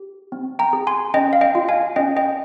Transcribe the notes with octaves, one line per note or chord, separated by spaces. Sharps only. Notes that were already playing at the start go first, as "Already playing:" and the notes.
Already playing: G4
C4
G5 A#5
G#4
G#5 C6
C#4 D#5 G5
F5
D#5 G5
F4
F5 G#5
C#4 D#5 G5
D#5 G5